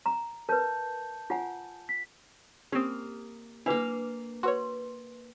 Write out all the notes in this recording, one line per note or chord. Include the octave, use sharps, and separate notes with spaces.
A#5
A#4 B4 A5 G6
F4 F#5 G#5
B6
A#3 C4 C#4 G4 D#6
A#3 D4 E4 B4 F5 D6
F#4 B4 C#5 C6